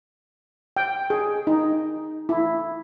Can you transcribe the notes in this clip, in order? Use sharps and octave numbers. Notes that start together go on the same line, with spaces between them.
G5
G#4
D#4
E4